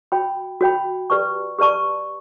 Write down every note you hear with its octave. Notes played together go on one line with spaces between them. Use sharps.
F#4 C#5 G5 B5
F#4 C#5 G5 B5
G4 B4 D5 A5 C#6
G4 B4 D5 A5 C#6